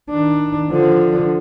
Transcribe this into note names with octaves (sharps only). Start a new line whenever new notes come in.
D#3 D4
D3 F3